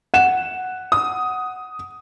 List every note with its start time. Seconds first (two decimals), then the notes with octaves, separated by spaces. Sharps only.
0.14 F#5 E7
0.92 D#6